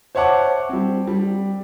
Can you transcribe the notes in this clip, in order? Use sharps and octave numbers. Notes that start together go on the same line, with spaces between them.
C5 C#5 E5 F#5 A5 D6
G3 C4
G3